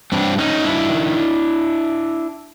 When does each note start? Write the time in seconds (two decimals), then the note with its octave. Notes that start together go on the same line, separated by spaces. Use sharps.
0.12 G2 C4 D4
0.38 D#3 C#4 D#4
0.64 G2 D4 E4
0.90 D#3